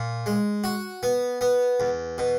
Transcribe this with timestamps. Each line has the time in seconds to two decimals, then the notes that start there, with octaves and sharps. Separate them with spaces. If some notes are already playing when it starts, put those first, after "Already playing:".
Already playing: A#2
0.26 G#3
0.64 F#4
1.03 B3
1.41 B3
1.80 E2
2.18 B2